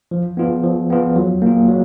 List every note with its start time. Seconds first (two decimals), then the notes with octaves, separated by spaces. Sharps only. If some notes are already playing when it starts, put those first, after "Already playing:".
0.11 F3
0.37 B3 F4
0.63 F3
0.90 B3 F4
1.16 F#3
1.42 A#3 F4
1.68 F#3